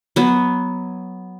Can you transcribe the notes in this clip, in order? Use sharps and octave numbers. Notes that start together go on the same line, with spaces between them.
F#3 B3